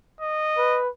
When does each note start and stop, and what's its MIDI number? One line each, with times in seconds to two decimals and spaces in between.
0.21 0.80 75
0.58 0.89 71